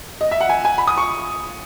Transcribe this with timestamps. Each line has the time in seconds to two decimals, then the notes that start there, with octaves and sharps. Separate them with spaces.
0.21 D#5
0.31 E5
0.41 F#5
0.49 G#5
0.65 G#5
0.78 B5
0.87 D#6
0.97 C#6